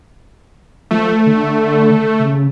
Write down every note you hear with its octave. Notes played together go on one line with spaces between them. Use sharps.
F3 A3
D3
C#3